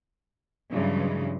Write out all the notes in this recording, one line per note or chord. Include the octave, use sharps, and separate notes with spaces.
G2 C#3 E3 F#3 G#3